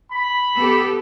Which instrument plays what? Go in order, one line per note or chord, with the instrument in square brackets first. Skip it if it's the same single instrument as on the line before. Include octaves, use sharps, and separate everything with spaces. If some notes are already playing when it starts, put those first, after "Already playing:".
[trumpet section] B5
[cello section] B3 G4 A4